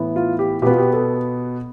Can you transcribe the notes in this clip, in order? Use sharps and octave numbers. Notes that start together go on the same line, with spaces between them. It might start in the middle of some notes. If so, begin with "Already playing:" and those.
Already playing: A2 E3 B3
F4
G4
B2 B3 F4 G4
G4
A4